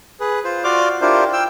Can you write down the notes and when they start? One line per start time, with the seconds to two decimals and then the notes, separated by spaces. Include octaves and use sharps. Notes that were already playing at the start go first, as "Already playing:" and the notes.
0.20 G#4 B4
0.44 F4 C5
0.64 F4 F#4 D5 C6 D6 F6
1.01 D4 E4 F4 G4 A#4 C5
1.33 G5 E6